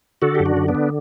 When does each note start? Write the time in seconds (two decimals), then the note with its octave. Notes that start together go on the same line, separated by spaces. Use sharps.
0.22 D3 F#4 A4
0.35 F#2 G4
0.45 D4 F#4
0.57 D3
0.68 B3 D4
0.75 D3